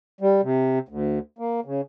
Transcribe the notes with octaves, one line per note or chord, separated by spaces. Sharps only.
G3
C3
D2
A#3
C#3